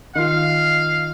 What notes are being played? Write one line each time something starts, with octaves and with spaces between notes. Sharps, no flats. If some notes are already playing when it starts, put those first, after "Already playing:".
D#3 F4 F5